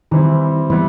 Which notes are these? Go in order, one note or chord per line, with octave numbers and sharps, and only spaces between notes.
D#3 E3 G3 C4 E4
E3 G3 B3 E4